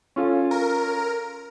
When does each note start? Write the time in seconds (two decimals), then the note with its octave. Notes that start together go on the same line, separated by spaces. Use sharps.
0.16 C#4 F4 A4
0.51 A#4